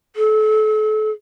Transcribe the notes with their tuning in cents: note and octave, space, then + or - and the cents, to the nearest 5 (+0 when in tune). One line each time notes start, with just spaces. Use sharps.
A4 -35